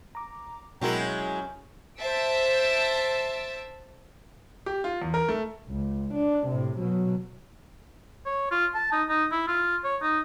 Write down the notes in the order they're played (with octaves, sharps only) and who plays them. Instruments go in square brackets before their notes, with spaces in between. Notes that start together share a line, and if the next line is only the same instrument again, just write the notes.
[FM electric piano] A#5 D6
[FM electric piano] B2 F#4 A#4 [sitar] F#3 G#3 E4 [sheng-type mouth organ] G5 A#5
[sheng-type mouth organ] C#4 [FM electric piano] G6
[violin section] C5 E5 A5 E6 D7
[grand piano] G4
F4
E2
A#4
A3
[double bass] C#2
D4
A2 C3
B2 F#3
[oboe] C#5
F4
A5
D#4
D#4
E4
F4
C#5
D#4